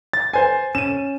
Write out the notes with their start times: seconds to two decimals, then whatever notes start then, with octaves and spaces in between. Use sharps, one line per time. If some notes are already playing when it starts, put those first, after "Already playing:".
0.13 A6
0.33 C5 G#5
0.75 C#4 D#7 E7